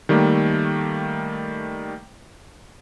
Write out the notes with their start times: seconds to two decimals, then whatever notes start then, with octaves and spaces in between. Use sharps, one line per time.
0.09 D#3 G3 A3 A#3